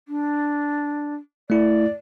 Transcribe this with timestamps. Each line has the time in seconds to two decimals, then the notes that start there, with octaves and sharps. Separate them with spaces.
0.08 D4
1.50 A3 E4 D5